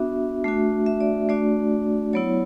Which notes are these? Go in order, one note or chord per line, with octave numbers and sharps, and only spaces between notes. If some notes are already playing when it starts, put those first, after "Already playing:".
Already playing: B3 D4 F#4 E5
A3 D4 F#4
E5
D5
A3 D4 F#4 D5
F#3 B3 E4 C#5